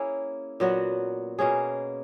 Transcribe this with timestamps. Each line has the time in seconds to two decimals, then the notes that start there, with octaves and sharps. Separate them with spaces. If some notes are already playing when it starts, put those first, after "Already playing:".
Already playing: A#3 C#4 E4 G#4
0.60 A#2 F#3 B3 F#4
1.39 B2 A#3 C#4 G#4